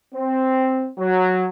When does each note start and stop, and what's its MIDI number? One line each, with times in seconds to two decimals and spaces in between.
0.14 0.88 60
0.98 1.47 54